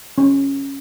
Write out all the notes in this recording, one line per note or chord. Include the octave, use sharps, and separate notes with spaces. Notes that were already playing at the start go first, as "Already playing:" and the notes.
C#4